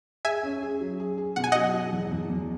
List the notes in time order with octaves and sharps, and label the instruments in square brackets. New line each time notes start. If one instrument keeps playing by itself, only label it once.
[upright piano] G#4 [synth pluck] E5 G#5
[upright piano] C#4
G#4
F#3
G#4
G#4
[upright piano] B2 [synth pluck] F#5
[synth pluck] G#5
[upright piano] F#3 [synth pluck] D#5 F#5
[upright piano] F#3
E2
E2
E2